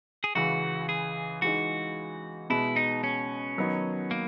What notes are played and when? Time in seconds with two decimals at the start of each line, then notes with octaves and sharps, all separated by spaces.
0.24 G#4
0.35 C#2 C#3 E3 F#4
0.89 G#4
1.42 E3 G#3 D#4 F#4
2.50 B2 G#3 B3 E4
2.76 D#4
3.04 C#4
3.58 D#3 F#3 B3 D#4
4.11 A#3